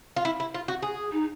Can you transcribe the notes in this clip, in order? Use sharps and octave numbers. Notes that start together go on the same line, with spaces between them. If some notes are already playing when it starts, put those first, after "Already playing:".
F4
E4
E4
F4
F#4
G#4
D#4